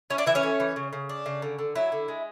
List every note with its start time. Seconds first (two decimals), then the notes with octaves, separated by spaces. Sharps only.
0.10 C#4 E4 C#5
0.18 D4 D5
0.26 E3 E4 E5
0.35 C#4 C#5
0.43 A3
0.60 E3
0.76 C#3
0.93 C#3
1.09 D4
1.26 C#3
1.42 D3
1.58 D3
1.75 F#3 E4
1.92 D3
2.08 G#3